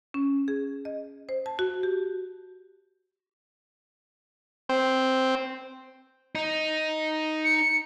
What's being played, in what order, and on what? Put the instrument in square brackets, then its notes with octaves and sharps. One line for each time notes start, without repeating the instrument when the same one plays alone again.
[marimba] C#4
G#4
D#5
C5
A5
F#4
G4
[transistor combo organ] C4
[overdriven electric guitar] D#4
[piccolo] C#7